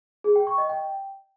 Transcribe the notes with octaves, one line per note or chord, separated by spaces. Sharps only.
G#4
G5
C#6
D#5
G5